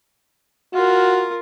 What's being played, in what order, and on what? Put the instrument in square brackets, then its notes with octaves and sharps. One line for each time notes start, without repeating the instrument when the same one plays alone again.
[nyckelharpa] F4 A#4 [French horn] F#4